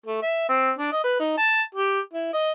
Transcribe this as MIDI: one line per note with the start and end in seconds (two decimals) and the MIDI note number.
0.06 0.21 57
0.22 0.46 76
0.49 0.71 60
0.79 0.92 62
0.92 1.04 75
1.04 1.19 71
1.20 1.34 63
1.38 1.62 81
1.75 2.00 67
2.13 2.29 64
2.33 2.52 75